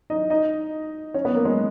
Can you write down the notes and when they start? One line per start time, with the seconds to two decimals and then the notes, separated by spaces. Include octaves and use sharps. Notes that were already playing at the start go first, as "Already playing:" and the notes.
0.10 D#4 D#5
0.30 D#4 D#5
1.14 C#4 C#5
1.25 B3 B4
1.35 A#3 A#4
1.45 G#3 G#4